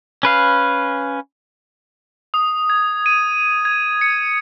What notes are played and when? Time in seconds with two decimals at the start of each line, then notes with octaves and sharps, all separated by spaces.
0.23 C#4 B4 F5
2.34 D#6
2.70 G#6
3.06 D#7
3.65 G#6
4.01 C#7